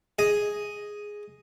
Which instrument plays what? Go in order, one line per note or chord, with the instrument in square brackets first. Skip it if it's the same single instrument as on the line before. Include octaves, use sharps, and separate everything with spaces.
[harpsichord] G#4 D#5 G#5